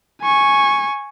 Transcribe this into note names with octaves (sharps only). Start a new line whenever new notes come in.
G#5 C#6